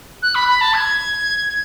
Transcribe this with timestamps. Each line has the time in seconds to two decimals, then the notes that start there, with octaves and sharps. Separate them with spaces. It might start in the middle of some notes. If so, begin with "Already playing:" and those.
0.22 F#6
0.35 B5
0.48 B5
0.61 A5
0.73 G#6